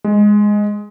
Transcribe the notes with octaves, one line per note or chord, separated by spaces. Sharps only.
G#3